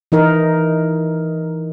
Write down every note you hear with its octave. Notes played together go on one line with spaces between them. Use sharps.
E3 D#4 A#4